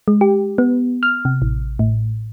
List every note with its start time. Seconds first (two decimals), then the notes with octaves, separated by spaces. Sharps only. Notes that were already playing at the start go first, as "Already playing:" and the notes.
0.08 G#3
0.21 G4
0.58 B3
1.03 F6
1.25 C3
1.42 A1
1.79 A2